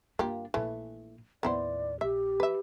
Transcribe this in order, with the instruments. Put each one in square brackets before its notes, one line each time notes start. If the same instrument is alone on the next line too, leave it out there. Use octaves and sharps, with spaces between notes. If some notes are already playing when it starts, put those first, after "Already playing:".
[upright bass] G1 D4 [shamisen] A#3 F4 G4
[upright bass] A#1 A#2 [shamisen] E3 A3
[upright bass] D#2 A2 [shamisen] B3 E4 C5 [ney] D5
[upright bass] A#1 [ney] G4 [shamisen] E5
[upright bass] E3 [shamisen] B4 E5